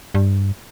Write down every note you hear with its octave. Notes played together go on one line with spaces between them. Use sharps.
G2